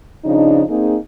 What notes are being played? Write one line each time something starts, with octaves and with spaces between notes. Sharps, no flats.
C#3 F3 D4 D#4
A#3 C4 D#4 G#4